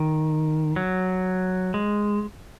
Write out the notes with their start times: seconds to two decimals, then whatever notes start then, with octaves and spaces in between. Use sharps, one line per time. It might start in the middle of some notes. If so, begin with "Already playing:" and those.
Already playing: D#3
0.76 F#3
1.74 G#3